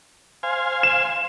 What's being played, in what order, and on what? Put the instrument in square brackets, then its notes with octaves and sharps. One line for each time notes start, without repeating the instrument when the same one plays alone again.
[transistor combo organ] C5 F5 G#5
[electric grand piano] E7